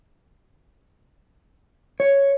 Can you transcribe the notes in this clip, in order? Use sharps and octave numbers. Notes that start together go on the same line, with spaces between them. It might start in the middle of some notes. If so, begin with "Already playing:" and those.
C#5